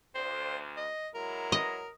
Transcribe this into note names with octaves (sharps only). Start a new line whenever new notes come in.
D2 C5
D#5
F#3 G#3 E4 A#4
D#5